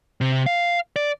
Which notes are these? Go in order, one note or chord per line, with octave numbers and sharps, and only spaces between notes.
C3
F5
D5